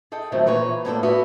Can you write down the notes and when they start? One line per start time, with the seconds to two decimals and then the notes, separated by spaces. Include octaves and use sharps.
0.12 G#4 A4 D#5 G5
0.32 D#3 F3 F#3 A3 C4 E4
0.46 A#2 E3 B4 C#5 G#5 A#5
0.85 A2 A#3 B3 C#4 D4 A4
1.03 D3 B3 F#4 E5